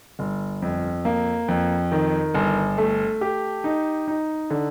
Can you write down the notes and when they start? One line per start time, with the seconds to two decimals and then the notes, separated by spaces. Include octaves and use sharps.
0.19 G1
0.62 F2
1.05 A#3
1.48 F2
1.92 D#3
2.34 G1
2.78 A3
3.21 G4
3.64 D#4
4.08 D#4
4.50 D3